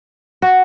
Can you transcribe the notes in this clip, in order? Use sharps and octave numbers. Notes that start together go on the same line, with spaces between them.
F#4